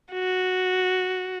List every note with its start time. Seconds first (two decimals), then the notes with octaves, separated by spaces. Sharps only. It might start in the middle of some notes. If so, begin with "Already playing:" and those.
0.13 F#4